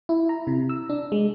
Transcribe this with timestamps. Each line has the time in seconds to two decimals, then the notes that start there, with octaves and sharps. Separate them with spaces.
0.09 E4
0.29 A#5
0.47 C3
0.69 E6
0.89 D4
1.12 G#3